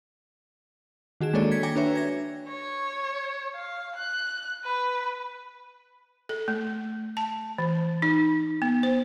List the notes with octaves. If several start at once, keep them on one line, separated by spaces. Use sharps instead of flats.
D#3 F#4 G#4 E7
G#3 A#3 D4 A4 C#5 D5
G#6 B6 C#7
G5 G#5 A#5 D6 A#6
D4 F#4 B4 C#5 E5
G#6 A#6
C#5
F5
F#6
B4
A4
A3
A5
E3
D#4
B3
C5